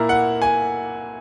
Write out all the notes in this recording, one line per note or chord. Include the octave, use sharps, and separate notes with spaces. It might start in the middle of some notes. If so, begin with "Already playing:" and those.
Already playing: A#2 A#3 E4 A#5
F#5
G#5